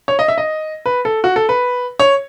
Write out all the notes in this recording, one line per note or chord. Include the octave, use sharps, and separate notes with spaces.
C#5
D#5
E5
D#5
B4
A4
F#4
A4
B4
C#5